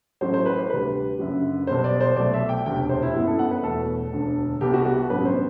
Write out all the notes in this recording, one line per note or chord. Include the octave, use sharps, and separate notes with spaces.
A1 A2 F#3 C5
C5
B4
C5
D2 C3 G3 B4
F#1 F#2 D3 F#3
B1 B2 G3 B3 C5
D5
C5
C2 B2 F#3 A3 D5
E5
G5
E1 D2 C3 G5
C5
E4
G1 F#2 F#3 B3 E4
A4
F#5
B4
E1 E2 B2 A3 A4
E1 D2 D3
C2 C3 G3 B3 G4
F#4
F#4
A1 G2 F#3 B3 B4
C5